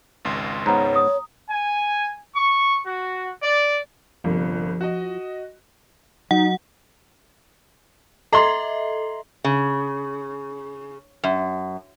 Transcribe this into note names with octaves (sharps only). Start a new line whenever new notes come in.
G#1 C#2 C6
G#2 B3 C#5 A#5
D#6
G#5
C#6
F#4
D5
G1 C2 F3
F#4 D#5
F#3 D#4 F#5
A4 D#5 E5 A#5 C6
C#3
F#2